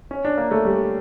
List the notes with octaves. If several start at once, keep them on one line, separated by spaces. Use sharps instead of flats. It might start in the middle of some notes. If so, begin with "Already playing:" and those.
C#4
D4
A#3
A3
G3